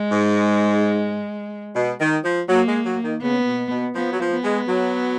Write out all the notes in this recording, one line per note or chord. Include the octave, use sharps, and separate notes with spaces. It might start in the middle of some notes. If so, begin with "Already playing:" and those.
Already playing: G#3
G#2
B2
D#3
F3
F#3 A#3
G#3
F#3
D#3
C#3 B3
B2
B2
F3 B3
F#3
F3
B3
G#3
F#3